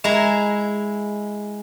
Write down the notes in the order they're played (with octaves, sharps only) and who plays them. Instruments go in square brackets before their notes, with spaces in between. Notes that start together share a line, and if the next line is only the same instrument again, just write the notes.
[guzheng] G#3 E4 A#5